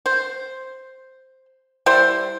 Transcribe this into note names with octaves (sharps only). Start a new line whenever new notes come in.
C5
G3 E4 C5